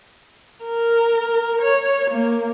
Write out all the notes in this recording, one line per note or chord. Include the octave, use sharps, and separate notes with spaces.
A#4
C#5
A#3